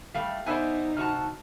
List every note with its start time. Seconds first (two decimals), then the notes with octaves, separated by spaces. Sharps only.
0.15 G3 A3 F5
0.46 B3 D#4 C5 D5 E5 G#5
0.97 C3 F#4 A5 F6